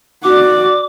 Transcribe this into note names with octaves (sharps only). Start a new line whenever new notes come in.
F#4 D5 D6